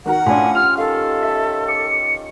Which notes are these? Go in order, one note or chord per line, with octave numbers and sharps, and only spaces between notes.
D#3 F#4 A#4 F#5
A2 F3 C#4 D4 G#5
F4 G4 F6 F7
D#3 A4 F5
E5
D6 C#7